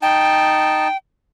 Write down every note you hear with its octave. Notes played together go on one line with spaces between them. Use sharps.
D#4 G5 A5